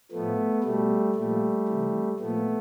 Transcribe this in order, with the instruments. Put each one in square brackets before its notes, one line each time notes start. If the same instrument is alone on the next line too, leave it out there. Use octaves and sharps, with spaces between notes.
[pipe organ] A2 F3 A3 B3
B2 G3 A3
A#2 F3 G3 A3
C3 E3
A#2 F3 A3 B3